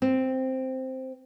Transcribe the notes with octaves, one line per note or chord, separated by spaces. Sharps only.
C4